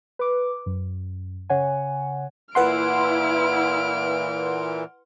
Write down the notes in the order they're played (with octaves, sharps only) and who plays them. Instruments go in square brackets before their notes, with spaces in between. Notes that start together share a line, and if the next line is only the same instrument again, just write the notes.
[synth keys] B4 D6
F#2
C#3 C#5 F#5 G#5
[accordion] A#2 E3 [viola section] E4 [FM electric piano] B4 F#5 C6 [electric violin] F6 D7